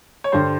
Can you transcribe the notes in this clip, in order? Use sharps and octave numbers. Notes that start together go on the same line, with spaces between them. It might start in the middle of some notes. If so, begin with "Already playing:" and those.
C#5
G2 D3 G3 C5